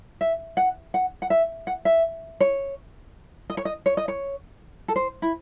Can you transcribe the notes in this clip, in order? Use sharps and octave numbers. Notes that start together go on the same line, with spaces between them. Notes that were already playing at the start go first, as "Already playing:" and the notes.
E5
F#5
F#5
F#5
E5
F#5
E5
C#5
D#5
C#5
D#5
C#5
D#5
C#5
A4
C5
E4